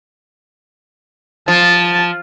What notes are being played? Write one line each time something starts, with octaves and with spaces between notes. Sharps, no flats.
F3 A5